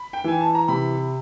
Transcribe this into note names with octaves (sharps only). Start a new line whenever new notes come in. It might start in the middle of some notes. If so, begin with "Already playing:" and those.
Already playing: B5
G5
E3 G#5
A5
A#5
C3 B5